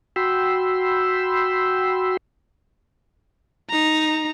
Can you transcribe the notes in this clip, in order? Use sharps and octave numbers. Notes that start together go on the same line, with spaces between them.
F#4 G5 B5 C6 E6
D#4 A#5